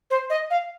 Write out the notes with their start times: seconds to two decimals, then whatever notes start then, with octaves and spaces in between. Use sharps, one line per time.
0.10 C5
0.30 D#5
0.50 F5